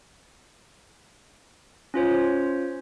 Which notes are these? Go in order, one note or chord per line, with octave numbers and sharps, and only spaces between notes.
C#4 F4 C5 C#5